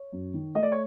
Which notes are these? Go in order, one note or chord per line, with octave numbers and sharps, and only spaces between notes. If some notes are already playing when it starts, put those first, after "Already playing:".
Already playing: C#5
F#2
D#3
A3 D#5
D5
C#5